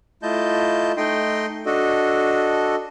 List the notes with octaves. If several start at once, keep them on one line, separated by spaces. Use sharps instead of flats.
A3 E4 F4 D#5 A5 G6
A3 D#4 D#5 G5 C6
D4 F#4 A4 D#5